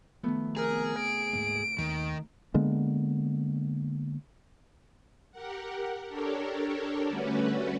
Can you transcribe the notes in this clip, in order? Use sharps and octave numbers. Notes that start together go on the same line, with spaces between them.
D#3 F3 A3 B3
C3 G#4 A#4
D7
D2 G#2 A#3
D#2 D#3
D3 G#3 A#3 B3
G4 A#4 F#5
D4 G4 A4 A#4 C#5
D3 G3 A3 C#4 F#4 B4